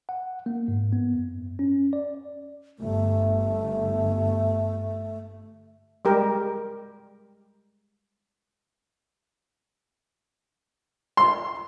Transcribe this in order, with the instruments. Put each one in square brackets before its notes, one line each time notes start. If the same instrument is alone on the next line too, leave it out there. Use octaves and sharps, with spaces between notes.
[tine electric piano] F#5
A#3
G#2
B3
F#2
C#4
D5
[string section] G1 [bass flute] A3
[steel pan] G3 G#3 G4 A#4
[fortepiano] C6